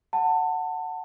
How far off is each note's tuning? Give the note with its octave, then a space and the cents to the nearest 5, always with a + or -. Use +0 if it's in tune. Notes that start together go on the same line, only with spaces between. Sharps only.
F#5 +0 A5 +25